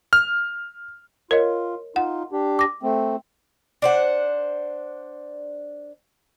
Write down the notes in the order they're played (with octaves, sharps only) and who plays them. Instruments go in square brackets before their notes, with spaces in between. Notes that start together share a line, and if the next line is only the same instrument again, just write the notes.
[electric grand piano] F6
[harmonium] F4 [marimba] A#4 C#5 D#5
[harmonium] D#4 F4 [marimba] F#5
[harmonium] D4 G4
[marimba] D6 A#6
[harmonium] A3 C4
[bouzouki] D4 C5 F#5